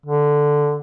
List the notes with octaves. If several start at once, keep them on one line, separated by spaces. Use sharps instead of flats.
D3